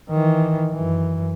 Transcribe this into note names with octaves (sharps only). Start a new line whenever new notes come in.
D#3 E3
F#2 E3